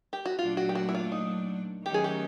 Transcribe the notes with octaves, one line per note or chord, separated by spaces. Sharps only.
G4
F#4
A#2 F#3 A3 D4 F4
F#4
G4
F#4
E4
F4
D#4
D#3 F#3 A3 C#4 G4
G#4
G4